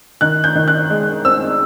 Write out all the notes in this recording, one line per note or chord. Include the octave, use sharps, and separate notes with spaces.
D#3 F#6
G6
D#3
F#6
G#3
C4 E6